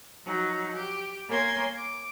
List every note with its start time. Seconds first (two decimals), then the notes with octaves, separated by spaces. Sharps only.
0.23 F3 F#3 D#4
0.75 G4
1.28 A#3 A#4 C#5 G#5 C6 G#6
1.76 D6